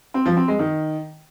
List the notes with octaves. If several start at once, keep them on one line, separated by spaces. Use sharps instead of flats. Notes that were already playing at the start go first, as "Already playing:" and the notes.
C4
F3
C4
G#3
D#3